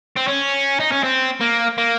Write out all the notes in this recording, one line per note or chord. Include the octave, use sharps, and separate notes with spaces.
C4
C#4
D#4
C#4
C4
A#3
A#3